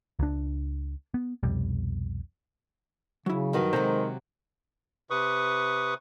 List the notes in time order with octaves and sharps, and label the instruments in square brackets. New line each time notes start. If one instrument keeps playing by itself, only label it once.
[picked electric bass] C#2 D4
B3
C2 F2 B2 G3
[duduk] C#3 [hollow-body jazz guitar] F#3 E4
[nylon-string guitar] G2 F#4 B4 [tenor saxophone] D#3
[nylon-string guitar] C3 F#3 [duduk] G#3 [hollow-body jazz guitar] A4 C5 A#5
[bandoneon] C3 B4 C#6 D#6